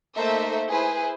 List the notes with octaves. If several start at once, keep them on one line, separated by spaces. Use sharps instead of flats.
A3 A#3 D#4 A4 C5 E5
E4 G#4 B4 C5